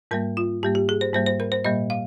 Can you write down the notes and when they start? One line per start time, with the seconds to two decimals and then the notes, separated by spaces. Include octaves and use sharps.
0.11 G#2 G3 A#3 A#4
0.37 F4
0.63 G#2 G3 A#3 G4
0.75 G4
0.89 G#4
1.01 C5
1.13 G#2 G3 A#3 C5
1.26 C5
1.40 A#4
1.52 C5
1.65 A#2 G3 A#3 D#5
1.90 F5